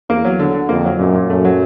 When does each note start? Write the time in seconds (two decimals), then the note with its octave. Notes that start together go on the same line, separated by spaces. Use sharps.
0.10 E2 A#3
0.25 F#3
0.39 D3
0.54 D3
0.69 F2 A#3
0.85 F#3
0.99 F#2 A#2
1.15 A#2
1.30 F#2 A3
1.45 F#3